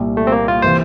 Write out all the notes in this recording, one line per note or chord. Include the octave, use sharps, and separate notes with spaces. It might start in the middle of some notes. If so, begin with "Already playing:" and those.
Already playing: C2 A#2 G3
A3
C4
A#3
F4
C3 E3 A#3 C5